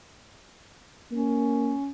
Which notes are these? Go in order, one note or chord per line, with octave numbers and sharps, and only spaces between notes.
A#3 C#4